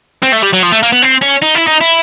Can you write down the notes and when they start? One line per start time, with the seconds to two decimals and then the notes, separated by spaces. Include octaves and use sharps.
0.23 C4
0.33 A3
0.43 G3
0.53 F#3
0.63 F3
0.72 A3
0.83 A#3
0.92 B3
1.02 C4
1.22 C#4
1.42 D#4
1.55 E4
1.67 D#4
1.81 E4